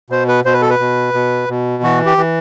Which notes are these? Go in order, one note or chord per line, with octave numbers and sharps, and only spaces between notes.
B2 C5
B4
B2 C5
B4
A4
B4
B2
B2
B2
E3 F#4
G4
E3